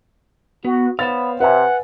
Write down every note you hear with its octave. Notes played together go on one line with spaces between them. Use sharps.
B3 F#4 B4
B3 C5 C#5 F5 A6
C3 B4 E5 F#5 G#5